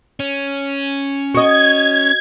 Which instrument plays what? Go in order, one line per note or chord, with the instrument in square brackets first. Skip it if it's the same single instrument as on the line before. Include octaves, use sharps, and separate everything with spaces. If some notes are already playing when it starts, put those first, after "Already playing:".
[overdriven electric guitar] C#4
[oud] F#4 D#5 [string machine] G#6